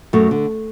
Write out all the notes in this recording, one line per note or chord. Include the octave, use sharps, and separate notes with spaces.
F#2 F#3 A3
D3